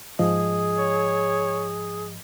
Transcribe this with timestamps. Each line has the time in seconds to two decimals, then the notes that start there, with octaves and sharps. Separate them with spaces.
0.19 G#2 F3 G#4 D#5
0.78 C#5